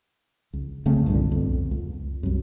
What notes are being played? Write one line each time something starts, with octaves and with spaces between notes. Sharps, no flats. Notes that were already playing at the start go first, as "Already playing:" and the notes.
C#2
F1 C#3 A3 C4
C2 G2 A#2 D3
B1 F2
C#2
C2 F#2